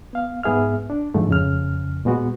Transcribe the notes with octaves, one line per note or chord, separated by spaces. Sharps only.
B3 F5
G#2 B3 G#4 E5 F6
D4
G#2 D3 F3 A3
F2 C#3 F6
A#2 G#3 B3 F#4